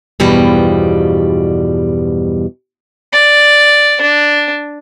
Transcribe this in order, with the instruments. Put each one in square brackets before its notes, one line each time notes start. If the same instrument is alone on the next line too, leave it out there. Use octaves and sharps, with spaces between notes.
[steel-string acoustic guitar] E2 G2 B2 F3 G3
[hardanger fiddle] D5
D4